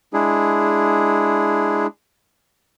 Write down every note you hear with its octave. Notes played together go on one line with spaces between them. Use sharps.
G#3 D4 E4 G#4